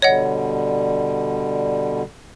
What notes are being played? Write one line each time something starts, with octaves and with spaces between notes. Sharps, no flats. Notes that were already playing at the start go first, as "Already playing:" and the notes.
B2 D3 G3 C#5 D#5 F#5